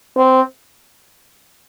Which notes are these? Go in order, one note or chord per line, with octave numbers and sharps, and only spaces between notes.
C4